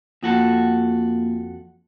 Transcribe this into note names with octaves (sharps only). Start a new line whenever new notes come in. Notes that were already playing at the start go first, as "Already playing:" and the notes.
F2 A#3 F4 F#4 A4